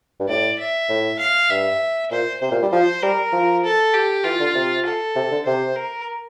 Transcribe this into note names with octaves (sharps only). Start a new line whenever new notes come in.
G2
A2 D5
E5
A2
F5
G2 E5
A#2 C5
C3 C5
A#2
G3
F3 C5
G3 A#4
F3
A4
G4
E3 F4
D3
C3
A4
C3
D3
C3 C5
A#4